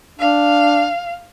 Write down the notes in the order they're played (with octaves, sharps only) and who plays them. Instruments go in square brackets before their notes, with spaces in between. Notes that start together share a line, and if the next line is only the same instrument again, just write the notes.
[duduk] D4 [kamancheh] F5